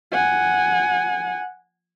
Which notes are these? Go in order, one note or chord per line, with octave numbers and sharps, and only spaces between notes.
F#5 G#5